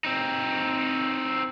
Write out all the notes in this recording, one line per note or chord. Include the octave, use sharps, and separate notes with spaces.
C4 D#4